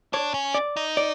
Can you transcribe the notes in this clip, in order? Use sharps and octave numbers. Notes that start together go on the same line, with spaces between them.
D4 C#5
C#4
D5
D#4
D5